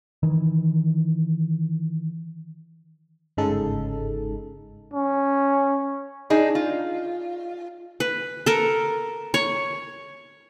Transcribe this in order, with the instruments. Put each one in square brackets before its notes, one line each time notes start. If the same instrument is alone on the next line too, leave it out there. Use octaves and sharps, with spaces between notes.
[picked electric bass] D#3 E3
[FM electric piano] G1 G#2 C#3 G#3 D#4 A4
[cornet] C#4
[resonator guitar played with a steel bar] D4 D#4 G#4
F4
[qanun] B4
A4 A#4
C#5